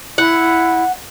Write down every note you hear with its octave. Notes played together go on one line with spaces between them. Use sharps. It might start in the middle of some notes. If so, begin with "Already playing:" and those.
E4 F#5